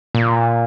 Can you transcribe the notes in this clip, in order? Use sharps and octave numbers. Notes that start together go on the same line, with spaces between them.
A#2